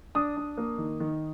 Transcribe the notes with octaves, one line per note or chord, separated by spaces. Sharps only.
D4 D#6
D4
A#3
D#3
D#3